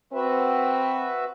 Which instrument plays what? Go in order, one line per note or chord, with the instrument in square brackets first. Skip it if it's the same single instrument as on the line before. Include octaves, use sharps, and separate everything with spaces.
[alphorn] C4 [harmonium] F#4 B4 E5